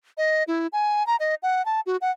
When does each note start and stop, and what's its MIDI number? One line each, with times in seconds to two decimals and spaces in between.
0.18 0.44 75
0.48 0.67 64
0.73 1.05 80
1.07 1.16 82
1.20 1.35 75
1.43 1.64 78
1.65 1.80 81
1.86 1.97 66
2.01 2.11 78